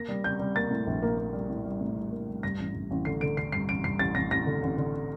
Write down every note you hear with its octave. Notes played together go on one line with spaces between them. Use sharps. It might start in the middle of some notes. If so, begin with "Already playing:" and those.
Already playing: A#3 A#6
G3
G3 G6
G3
A#3 A6
A2
A#1
A#3
A#3
G3
A2
G3
A2
G3
A#3
G3
G2 A#6
A1
G2
A1
D3 C7
D3 D7
D3 C7
G2 C7
A1 D7
G2 C7
A1 A6
A1 A#6
A1 A#6
D3
A1
D3